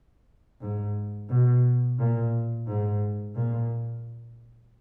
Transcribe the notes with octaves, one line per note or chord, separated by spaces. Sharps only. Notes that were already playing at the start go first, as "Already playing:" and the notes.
G#2
B2
A#2
G#2
A#2